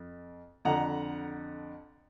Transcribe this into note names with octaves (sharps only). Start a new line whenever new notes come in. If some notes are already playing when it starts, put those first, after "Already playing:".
Already playing: F2
F2 D3 F#5 A#5